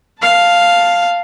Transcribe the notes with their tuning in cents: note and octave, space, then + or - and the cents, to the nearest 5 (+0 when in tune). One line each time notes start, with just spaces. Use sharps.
F5 +0 A5 +0